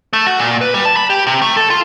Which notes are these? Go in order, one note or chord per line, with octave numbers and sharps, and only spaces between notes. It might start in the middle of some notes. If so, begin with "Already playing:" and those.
A3
F#4
A#2
B4
G3
A5
B5
G4
C3
A3
A4
F4